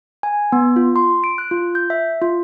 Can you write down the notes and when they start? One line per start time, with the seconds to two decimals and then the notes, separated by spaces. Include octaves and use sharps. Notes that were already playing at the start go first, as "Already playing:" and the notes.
0.23 G#5
0.52 B3
0.76 F4
0.96 C6
1.24 D7
1.38 F#6
1.51 F4
1.75 G6
1.90 E5
2.22 F4